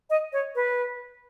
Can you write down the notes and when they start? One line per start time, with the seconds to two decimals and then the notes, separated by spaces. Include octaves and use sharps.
0.10 D#5
0.33 C#5
0.55 B4